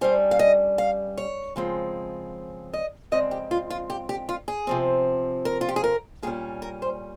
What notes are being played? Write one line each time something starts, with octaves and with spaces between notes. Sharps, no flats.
G2 G3 C#4 C5
F5
D#5
F5
C#5
C#3 F3 G#3 C4
D#5
F2 C#3 G#3 C4 D#5
G4
F4
F4
G4
G4
F4
G#4
C3 F3 C4
A#4
F4
G4
G#4
A#4
A#2 G3 C#4 G#4
A#4
C5